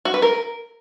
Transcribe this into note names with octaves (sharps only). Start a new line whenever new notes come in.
F#4
B4
A#4